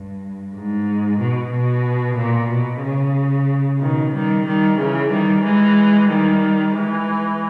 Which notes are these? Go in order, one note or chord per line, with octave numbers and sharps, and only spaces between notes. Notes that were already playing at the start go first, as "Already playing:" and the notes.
Already playing: G2
G#2
B2
B2
A#2
B2
C#3
B2 D#3
D#3 G3
D#3 G3
C#3 E3
D#3 G3
E3 G#3
D#3 G3
E3 G#3